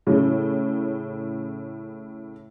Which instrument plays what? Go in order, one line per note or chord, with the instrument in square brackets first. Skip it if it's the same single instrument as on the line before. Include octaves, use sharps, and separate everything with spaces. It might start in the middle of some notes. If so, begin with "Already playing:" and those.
[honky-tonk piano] A2 C#3